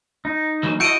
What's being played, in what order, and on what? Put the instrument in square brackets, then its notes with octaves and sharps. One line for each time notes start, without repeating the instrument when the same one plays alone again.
[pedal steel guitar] D#4
[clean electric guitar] E3 F#3 A#3
[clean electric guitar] E4 D#5 [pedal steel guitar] F#4 A4 [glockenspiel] G6 D7 D#7